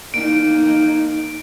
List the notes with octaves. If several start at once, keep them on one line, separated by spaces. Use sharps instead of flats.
A#3 D#4 D7